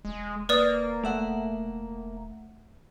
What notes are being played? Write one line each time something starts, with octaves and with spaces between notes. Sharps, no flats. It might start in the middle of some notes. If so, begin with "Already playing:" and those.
E1 G#3
A#3 B4 D5 D#6 F6 A6
E1 A3 E5 F#5